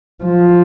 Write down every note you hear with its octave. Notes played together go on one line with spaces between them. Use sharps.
F3